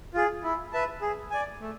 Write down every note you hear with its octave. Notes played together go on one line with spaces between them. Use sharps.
F4 G#4
E4
B4 E5 A5
G#4
D5 G#5
A3